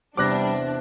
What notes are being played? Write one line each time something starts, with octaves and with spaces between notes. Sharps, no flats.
E2 C3 G3 D4 D6 F#6 A#6